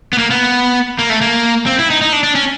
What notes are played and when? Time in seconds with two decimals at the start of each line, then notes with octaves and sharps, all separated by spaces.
0.13 B3
0.18 A#3
0.31 B3
0.99 A#3
1.10 A3
1.21 A#3
1.66 C4
1.79 E4
1.90 D#4
2.01 D#4
2.13 D4
2.23 D4
2.35 C#4